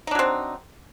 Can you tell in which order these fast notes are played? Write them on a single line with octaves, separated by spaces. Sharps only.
D#4 D4 F#3 C4